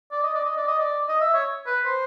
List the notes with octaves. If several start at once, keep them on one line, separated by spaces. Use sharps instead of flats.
D5
D#5
D5
D#5
D5
D#5
D5
D#5
E5
C#5
B4
C5